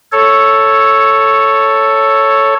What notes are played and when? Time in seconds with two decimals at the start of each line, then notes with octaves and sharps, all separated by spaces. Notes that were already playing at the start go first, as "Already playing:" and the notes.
0.12 A4 C#5